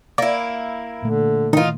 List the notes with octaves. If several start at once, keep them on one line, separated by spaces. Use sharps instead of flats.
A#3 E4 D5
A#2 D3 A3
D#3 E3 D#4 F4